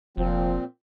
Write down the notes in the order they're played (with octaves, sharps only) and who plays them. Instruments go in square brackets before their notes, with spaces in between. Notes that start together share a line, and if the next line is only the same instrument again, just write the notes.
[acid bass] F1 [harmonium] A#2 C4 [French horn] F3